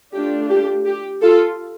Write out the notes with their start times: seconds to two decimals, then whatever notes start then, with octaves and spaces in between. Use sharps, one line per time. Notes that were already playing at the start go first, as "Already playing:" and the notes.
0.13 A3 D4 F4 G4
0.51 G4
0.86 G4
1.22 F4 A4